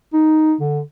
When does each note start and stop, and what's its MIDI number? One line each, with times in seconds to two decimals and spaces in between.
0.14 0.54 63
0.60 0.81 50